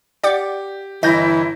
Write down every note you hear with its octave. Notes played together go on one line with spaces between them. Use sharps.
G4 D5 F#5 D6
G1 E3 E4 D#5 G6 A#6